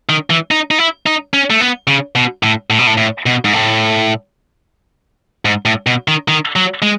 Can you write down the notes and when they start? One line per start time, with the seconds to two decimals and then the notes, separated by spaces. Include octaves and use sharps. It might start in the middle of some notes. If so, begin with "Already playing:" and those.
0.09 D#3
0.30 E3
0.51 D#4
0.71 D#4
0.79 E4
1.06 D#4
1.34 C#4
1.50 A3
1.61 B3
1.87 C#3
2.15 B2
2.43 A2
2.70 A2
2.79 B2
2.87 A2
2.97 A2
3.26 B2
3.45 G#2
3.53 A2
5.45 G#2
5.65 A2
5.87 B2
6.08 D#3
6.28 D#3
6.56 F#3
6.82 G#3